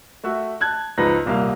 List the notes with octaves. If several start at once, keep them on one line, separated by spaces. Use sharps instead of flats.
A3 F#4 E5
A5 F#6 G#6
C#2 F3 D#4 B4 A#5 A#6
D#1 C2 A#3 F5